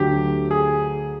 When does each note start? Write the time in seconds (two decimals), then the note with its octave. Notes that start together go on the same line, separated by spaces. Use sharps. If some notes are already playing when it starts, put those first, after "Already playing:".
Already playing: D2 D3 F#3 G4
0.51 G#4